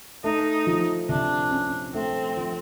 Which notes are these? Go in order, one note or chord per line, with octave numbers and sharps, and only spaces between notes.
A3 D#4
F3
C3 D4
C#4
A3 C4
F3